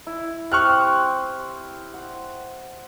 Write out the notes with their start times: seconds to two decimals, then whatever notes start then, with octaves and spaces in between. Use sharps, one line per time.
0.07 E4
0.52 C4 G4 C5 C#6 F6 F#6
1.94 F#5